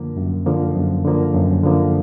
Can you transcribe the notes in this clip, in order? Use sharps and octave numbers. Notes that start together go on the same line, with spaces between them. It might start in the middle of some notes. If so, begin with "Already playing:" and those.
Already playing: F#2 D3 F3 A#3
F#2
D3 F3 A#3
F#2
D3 F3 A#3
F#2
D3 F3 A#3